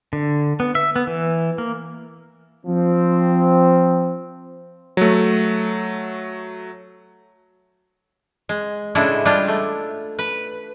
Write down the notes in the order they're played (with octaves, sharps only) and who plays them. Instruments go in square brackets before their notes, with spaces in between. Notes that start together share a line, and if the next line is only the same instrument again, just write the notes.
[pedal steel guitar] D3
B3
E5
B3
E3
A#3
[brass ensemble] F3 C4
[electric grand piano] F#3 A3
[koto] G#3
A2 C#3 G#3 D4 E4
G3 G#3 D4 F4
A3
B4